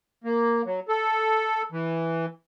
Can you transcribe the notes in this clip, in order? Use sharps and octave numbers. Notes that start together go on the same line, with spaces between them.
A#3
F#3
A4
E3